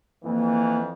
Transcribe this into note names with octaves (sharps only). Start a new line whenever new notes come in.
F2 E3 A#3